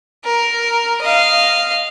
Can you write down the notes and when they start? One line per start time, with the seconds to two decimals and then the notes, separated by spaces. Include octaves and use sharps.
0.24 A#4
1.01 D#5 F5